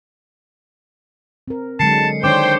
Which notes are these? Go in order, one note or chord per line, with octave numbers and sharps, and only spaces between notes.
C4 A#4
D3 F#3 G#3 A5 C7 C#7
D#3 D4 C5 C#5 G5 D6 G6 D7